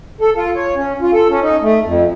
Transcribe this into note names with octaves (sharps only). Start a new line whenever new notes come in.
A4
F4
C#5
C#4
F4
A4
C#4
D#4
A3
F2